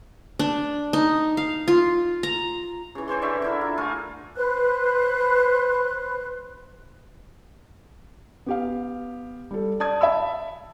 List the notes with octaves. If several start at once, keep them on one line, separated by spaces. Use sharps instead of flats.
D4
D#4
F5
F4
A#5
C#3 E3
E3 C5 C#5 C6
D3 D5 E5 C#6
D3 E4 A#4
F4
A3 F4 A#4 G#5
B4 C5 F#6
B3 G4 F5
G3 A4
D5 A5 D#6 G#6
E5 A5 B5 E6